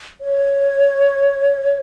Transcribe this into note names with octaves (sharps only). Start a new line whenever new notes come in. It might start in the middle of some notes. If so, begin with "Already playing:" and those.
C#5